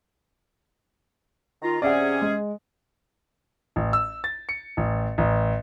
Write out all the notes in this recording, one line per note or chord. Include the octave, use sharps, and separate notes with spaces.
D#3 F4 A#5
C3 C#4 G#4 D5 E5 F#5
G#3
A1
E6
A6
C#7
A1
A1